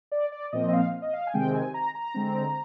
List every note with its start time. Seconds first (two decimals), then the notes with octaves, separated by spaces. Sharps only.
0.12 D5
0.32 D5
0.52 A#2 F3 C4 D#5
0.68 D#5
0.73 F5
1.02 D#5
1.13 F5
1.27 G#5
1.34 C3 D#3 G#3 C4 G5
1.54 G#5
1.74 A#5
1.95 A#5
2.14 D3 G#3 C4